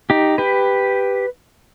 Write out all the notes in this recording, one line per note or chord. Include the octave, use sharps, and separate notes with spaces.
D#4 G4
G4 B4